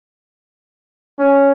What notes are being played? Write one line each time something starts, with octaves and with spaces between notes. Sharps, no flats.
C#4